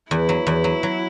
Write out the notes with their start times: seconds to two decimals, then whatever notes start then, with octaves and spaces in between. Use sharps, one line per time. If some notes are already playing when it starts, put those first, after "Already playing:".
0.11 E2 E4
0.29 F#3
0.47 E2
0.64 F#3
0.83 F#3